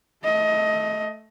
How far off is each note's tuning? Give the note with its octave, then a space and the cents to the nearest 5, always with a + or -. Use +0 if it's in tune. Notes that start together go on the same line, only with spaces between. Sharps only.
A3 -5 D#5 +20